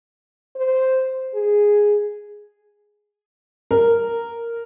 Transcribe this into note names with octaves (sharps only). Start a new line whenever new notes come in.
C5
G#4
A#4